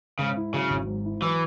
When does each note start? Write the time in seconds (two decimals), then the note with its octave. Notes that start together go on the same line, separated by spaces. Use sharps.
0.19 G#2 C#3
0.37 E4
0.54 C#3 F#3
0.70 G#1
0.87 G#2
1.05 E4
1.21 E3 F#3